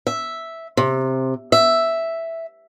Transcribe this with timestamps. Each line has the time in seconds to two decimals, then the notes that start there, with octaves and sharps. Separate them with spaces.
0.07 E5
0.77 C3
1.52 E5